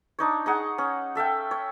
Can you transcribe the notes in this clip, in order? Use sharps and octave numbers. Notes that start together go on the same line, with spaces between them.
D4 D#4 C#5
D#4 G#4 F#5
C#4
A4 E5 F5 G5
C#5